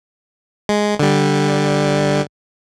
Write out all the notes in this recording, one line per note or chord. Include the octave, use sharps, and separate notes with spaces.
G#3
D3 G3